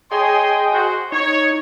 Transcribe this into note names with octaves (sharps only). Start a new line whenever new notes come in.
G#4 C#5 D#5 G5 G#5 C6
F#4 C5
D#4 C#5